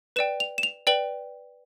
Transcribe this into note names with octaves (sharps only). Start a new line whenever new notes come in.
B4 D5 G5 E7
F7
E7
F7
B4 D5 G5 F#7